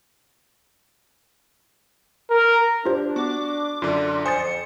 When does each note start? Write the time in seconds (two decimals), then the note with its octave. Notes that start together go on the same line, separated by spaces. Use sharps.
2.30 A#4
2.86 D4 F4 G4 C5
3.16 B3 F#4 D6
3.82 F#2 D3 F4 D5
4.26 F2 C5 G#5 D#6 A6 C#7